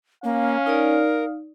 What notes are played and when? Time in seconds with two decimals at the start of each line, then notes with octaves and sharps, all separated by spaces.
0.24 A#3 C#4 F5
0.66 D#4 A#4 D5